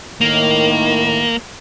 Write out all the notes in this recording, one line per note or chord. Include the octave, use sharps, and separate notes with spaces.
A2 D#3 A#3